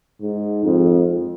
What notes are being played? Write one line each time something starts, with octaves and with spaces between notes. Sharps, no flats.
G#2
F2